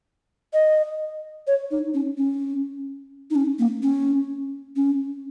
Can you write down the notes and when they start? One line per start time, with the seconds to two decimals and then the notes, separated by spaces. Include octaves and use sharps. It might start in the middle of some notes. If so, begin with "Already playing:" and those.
0.53 D#5
1.47 C#5
1.71 D#4
1.94 C#4
2.18 C#4
3.30 D#4
3.35 C#4
3.59 A#3
3.83 C#4
4.76 C#4